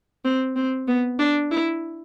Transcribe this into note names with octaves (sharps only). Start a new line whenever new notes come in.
C4
C4
B3
D4
E4